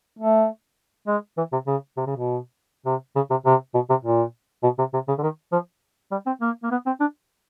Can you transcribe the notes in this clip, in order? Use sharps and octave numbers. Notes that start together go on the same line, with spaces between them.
A3
G#3
E3
C3
C#3
C3
C#3
B2
C3
C#3
C3
C3
B2
C3
A#2
B2
C3
C3
C#3
D3
D#3
F3
G3
C4
A#3
A#3
B3
C4
D4